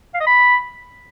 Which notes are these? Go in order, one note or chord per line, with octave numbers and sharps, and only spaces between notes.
F5
D#5
B5